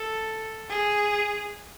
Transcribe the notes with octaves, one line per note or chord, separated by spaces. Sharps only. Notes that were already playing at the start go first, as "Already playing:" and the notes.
Already playing: A4
G#4